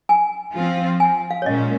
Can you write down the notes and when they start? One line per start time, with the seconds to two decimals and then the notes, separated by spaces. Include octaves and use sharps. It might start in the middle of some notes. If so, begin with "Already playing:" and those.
0.09 G#5
0.55 F3 C4 F4
1.00 G#5
1.31 F5
1.42 C#5
1.46 A#2 G#3 C#4 D#5